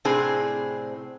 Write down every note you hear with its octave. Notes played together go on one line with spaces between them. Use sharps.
A2 C3 C4 D4 G#4